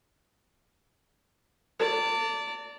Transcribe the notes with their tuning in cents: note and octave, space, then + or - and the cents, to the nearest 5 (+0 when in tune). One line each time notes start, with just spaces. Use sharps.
D5 -20 A5 +40